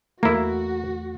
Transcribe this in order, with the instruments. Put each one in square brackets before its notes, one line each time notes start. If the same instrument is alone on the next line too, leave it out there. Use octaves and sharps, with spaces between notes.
[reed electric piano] E2 A3 [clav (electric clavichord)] A#3 E4 [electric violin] F#4